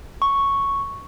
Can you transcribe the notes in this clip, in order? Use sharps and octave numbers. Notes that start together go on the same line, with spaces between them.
C#6